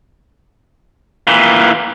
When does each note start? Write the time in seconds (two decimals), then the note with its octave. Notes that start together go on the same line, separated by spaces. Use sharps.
1.28 A#2 E3